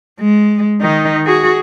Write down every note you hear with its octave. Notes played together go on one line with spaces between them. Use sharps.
G#3
D#3 D#4
F#4 G#4